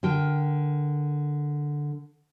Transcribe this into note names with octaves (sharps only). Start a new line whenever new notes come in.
D3 A#4 G5